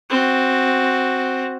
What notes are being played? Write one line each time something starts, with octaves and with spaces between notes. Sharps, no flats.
C4 F#4